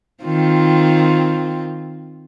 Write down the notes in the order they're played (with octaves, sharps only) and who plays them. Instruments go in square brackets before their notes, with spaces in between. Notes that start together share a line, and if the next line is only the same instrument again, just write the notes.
[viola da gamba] D#3 C4 F4